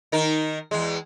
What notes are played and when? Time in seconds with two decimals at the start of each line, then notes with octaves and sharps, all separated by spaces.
0.12 D#3 D#4 A#4
0.71 E2 G#3